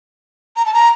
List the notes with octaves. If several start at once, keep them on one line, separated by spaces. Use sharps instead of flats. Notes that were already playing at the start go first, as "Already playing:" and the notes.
A#5
A5
A#5